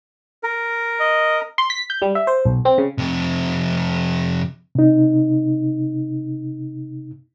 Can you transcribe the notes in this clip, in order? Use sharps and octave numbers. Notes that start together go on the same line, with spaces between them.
A#4
D#5
C6
B6
G6
G3
E5
C5
B1
C4
C#3
F2 C3
C3 D#4